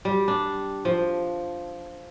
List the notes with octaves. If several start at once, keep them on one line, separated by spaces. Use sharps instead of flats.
G3
D4
F3